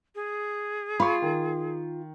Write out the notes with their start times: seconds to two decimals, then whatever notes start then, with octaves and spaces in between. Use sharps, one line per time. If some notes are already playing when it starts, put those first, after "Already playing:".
0.15 G#4
1.00 F4 B5 C#6
1.22 D#3